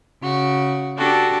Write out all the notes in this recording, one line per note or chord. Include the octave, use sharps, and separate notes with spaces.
C#3 F#4
D4 F#4 G4 A4